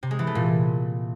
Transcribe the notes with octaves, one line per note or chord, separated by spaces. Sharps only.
C3
G#3
E3
A3
A#2